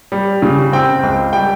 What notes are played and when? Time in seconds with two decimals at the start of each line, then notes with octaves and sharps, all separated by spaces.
0.12 G3
0.42 C#3
0.73 C4 G5
1.03 C#2
1.33 G3 G5